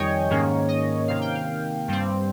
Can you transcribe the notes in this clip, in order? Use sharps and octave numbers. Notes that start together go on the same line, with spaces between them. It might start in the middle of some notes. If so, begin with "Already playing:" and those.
Already playing: F2 D#3 G3 C#5 D#5 G5 G#5
G#2 D#3 A#3 C#4
D#5
C3 D#3 A#3 F5
G5
F5
G2 G3 C4